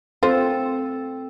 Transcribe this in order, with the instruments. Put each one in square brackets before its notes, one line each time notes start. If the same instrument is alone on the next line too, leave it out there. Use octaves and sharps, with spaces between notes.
[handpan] C4 A4 [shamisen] F4 C5